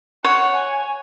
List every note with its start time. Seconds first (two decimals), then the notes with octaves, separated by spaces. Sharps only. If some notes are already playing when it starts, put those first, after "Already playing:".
0.24 C#5 F#5
0.56 G#5